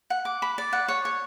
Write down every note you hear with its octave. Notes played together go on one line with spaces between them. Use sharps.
F#5
D6
B5
D5
F#5
C#5
C#5